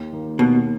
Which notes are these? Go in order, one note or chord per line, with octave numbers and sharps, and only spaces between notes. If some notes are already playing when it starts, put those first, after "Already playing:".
Already playing: D#2
D#3 A#3
D#2 B2